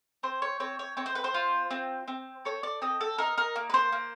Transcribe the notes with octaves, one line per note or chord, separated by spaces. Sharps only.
C4 C5
C#5
C4 C#5
C#5
C4 C#5
C5
B4
C5
F4
C4
C4
A4 C#5
D5
C4 D#5
A4
D#4 A#4
A#4
A#3
B4
C5
A#3